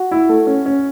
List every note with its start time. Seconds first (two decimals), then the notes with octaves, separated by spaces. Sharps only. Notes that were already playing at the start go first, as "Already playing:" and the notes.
Already playing: F#4
0.11 E4
0.29 A3
0.47 C#4
0.66 C#4